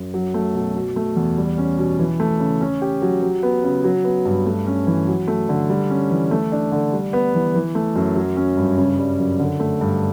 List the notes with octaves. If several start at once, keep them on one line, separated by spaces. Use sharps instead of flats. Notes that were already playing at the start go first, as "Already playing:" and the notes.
Already playing: F#2
F#3
A3
B2
B2
A3
E2
G3
C#4
B2
E3
A3
C#3
C#4
G4
F#3
F#3
B3
C#3
F#3
B3
G2
A3
C#4
E3
F#3
A3
D3
G3
C#4
E3
A3
D4
D3
G3
B3
E3
E3
A3
F#2
F#3
C#4
G2
C#3
G3
F#2
D3
A3
G2